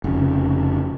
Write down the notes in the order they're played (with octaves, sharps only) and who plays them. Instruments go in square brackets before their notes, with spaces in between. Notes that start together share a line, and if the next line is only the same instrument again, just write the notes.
[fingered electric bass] F1 C#3